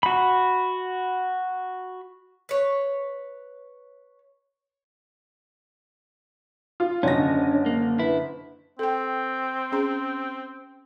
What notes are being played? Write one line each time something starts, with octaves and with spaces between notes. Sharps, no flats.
F#4 B5
B4 C#5
F4
F#1 D3 C#4 D4 C#5 D#5 A#6
A#3
E4 B4
C4 A4 G5
C#4 G#4 A#5